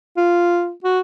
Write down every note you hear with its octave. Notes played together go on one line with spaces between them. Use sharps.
F4
F#4